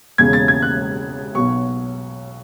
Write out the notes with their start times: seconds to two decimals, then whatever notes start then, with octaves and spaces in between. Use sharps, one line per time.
0.18 E1 E2 C#3 G#3 G#6
0.33 A6
0.48 G#6
0.62 F#6
1.35 B1 B2 F#3 C#6